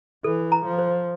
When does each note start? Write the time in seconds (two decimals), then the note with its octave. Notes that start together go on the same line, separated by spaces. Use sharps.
0.24 E3 A4
0.52 A#5
0.66 F3
0.79 C5